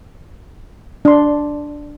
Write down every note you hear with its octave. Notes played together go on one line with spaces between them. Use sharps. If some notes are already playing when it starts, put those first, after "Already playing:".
D4 C6